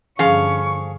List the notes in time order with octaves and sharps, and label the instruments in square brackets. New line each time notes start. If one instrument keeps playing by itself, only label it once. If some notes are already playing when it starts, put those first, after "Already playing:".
[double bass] G2 D3 [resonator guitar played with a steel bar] F3 C#4 F5 [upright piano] G#4 [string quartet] C#6